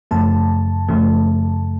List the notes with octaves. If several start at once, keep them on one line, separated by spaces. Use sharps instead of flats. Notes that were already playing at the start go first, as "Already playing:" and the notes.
F#2 C#3 F3 A3 A5
F#2 C#3 F3 A3